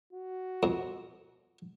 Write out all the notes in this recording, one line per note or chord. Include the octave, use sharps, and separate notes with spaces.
F#4
F2